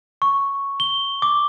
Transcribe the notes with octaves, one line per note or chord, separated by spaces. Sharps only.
C#6
G7
D6